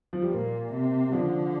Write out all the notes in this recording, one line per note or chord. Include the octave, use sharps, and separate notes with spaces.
F3
G3
A#2 A#3
C3
G3
D3 F3